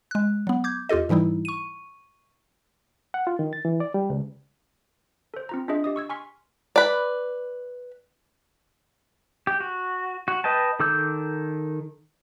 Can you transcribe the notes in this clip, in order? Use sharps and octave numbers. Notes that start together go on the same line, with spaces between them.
G#3 F#6
F#3 B3
D6 G6 G#6
E2 F4 G4 A4 D#5
G#2 E3 G3 D#4 E4
C#6 D#7
F#5
F4
D#3
A6
E3
D5
G3
C#2
A4 C5
C4 F4 A#5
D4 F4 G#4 D#5 E5
G4 D#5 D#6
C#6 E6 G#6
G#5 C6 C#6 F6 B6
B4 D5
G4
F#4
F#4
B4 D#5 G5 A5
D#3 A4 D6 E6 G6